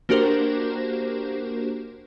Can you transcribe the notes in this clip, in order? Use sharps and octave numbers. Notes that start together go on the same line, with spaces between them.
A#3 D4 F#4 G4 A#4 C5